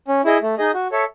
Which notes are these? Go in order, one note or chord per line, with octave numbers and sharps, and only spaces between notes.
C#4
E4 G#4 D#5
A3
D#4 G#4 D#5
F#4
A4 C#5 E5